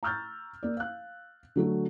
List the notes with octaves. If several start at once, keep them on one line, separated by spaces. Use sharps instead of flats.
A#5 C#6 E6 F6 G6 A6
A#3 D5
F5 F#6
D3 F#3 A3 F#4